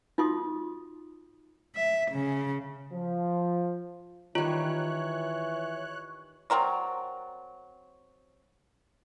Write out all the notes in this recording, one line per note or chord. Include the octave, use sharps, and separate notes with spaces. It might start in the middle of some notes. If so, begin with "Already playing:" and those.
D#4 F4 F#4 C6 D#6
E5
C#3
F3
D#3 E3 G3 F4 C#5 F#6
F#3 C4 A#4 D5